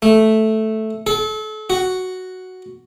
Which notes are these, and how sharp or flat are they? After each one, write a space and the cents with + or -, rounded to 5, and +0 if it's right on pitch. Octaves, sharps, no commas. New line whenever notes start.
A3 -5
A4 -35
F#4 +0